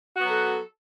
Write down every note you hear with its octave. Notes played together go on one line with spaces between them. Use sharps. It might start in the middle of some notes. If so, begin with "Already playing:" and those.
F#3 B3 F#4 A4